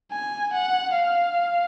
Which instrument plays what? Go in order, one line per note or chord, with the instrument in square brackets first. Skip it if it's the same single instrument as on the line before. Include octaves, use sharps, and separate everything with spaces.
[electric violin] G#5
F#5
F5